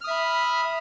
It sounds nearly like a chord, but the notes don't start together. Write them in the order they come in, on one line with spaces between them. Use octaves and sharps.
F6 D#6 E5 B5